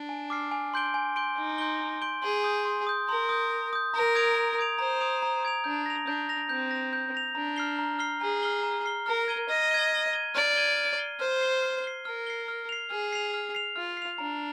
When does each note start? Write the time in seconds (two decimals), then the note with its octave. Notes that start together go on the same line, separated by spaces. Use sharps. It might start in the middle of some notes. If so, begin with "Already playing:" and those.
Already playing: D4
0.09 G#5
0.30 D6 F6 C7
0.52 G#5
0.74 C6 G6 D7 G7
0.94 G#5
1.16 C6 G6 D7 G7
1.37 D#4 G#5
1.58 C6 G6 D7 G7
1.81 G#5
2.02 C6 G6 D7 G7
2.22 G#4 C6
2.44 D#6 G6
2.65 C6
2.87 D#6 G6
3.08 A#4 C6
3.29 D#6 G6
3.51 C6
3.73 D#6 G6
3.94 A#4 A#5
4.15 D#6 G#6 D7 F7
4.36 A#5
4.58 D#6 G#6 D7 F7
4.79 C5 A#5
5.00 D#6 G#6 D7 F7
5.22 A#5
5.43 D#6 G#6 D7 F7
5.64 D4 G6
5.86 A#6 F7
6.07 D4 G6
6.29 A#6 F7
6.49 C4 G6
6.71 A#6 F7
6.93 G6
7.15 A#6 F7
7.35 D4 A#5
7.56 F6 C7 G7
7.79 A#5
7.99 F6 C7 G7
8.21 G#4 A#5
8.43 F6 C7 G7
8.63 A#5
8.85 F6 C7 G7
9.06 A#4 F6
9.28 G#6 D#7 G7
9.48 D#5 F6
9.71 G#6 D#7 G7
9.92 F6
10.13 G#6 D#7 G7
10.35 D5 F6
10.56 G#6 D#7 G7
10.77 F6
10.98 C7 G7
11.19 C5 F6
11.41 C7 G7
11.62 F6
11.84 C7 G7
12.05 A#4 F6
12.27 C7 G7
12.48 F6
12.69 C7 F7
12.90 G#4 F6
13.13 C7 F7
13.34 F6
13.55 C7 F7
13.76 F4 F6
13.97 C7 F7
14.18 D4 A#5